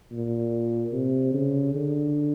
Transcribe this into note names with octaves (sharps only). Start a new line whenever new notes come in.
A#2
C3
C#3
D3